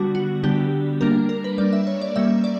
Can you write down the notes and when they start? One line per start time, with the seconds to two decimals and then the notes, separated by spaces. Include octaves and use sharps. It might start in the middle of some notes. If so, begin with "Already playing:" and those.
Already playing: D3 G3 B3 D4 F#4
0.15 F#4
0.43 D3 G3 B3 D4 G4
1.01 G3 A#3 D4 A#4
1.29 A#4
1.44 B4
1.58 G3 A#3 D4 D5
1.73 E5
1.87 C#5
2.01 D5
2.16 G3 A#3 C#4 E5
2.44 D5